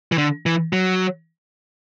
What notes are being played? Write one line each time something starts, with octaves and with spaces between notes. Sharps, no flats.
E3
D3
E3
F#3